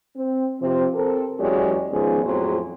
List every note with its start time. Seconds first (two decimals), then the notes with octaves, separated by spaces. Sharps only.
0.16 C4
0.61 C3 F3 C4
0.94 C4 A4 A#4
1.39 E2 F#3 G#3 C#4 G4 D5
1.91 D#3 F3 G#3 B3 C#4 G#4
2.24 F2 A2 F#3 G#4 C5 C#5